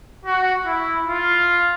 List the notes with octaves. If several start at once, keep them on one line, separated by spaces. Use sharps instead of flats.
F#4
E4
F4